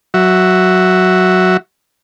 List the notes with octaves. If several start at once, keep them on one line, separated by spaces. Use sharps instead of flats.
F#3 F#4 E5